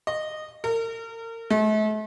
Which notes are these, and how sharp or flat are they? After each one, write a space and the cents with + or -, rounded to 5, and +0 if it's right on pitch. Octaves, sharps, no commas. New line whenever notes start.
D#5 -15
A#4 -35
A3 -40